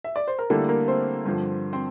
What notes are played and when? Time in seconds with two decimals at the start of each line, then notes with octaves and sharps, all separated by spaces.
0.04 E5
0.16 D5
0.27 C5
0.39 A#4
0.50 D3 G3 A3 A#3 E4 A4
0.69 A#3 A#4
0.88 C4 C5
1.25 G2 D3 F3
1.73 C4 C5